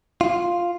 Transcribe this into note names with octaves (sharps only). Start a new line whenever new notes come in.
F4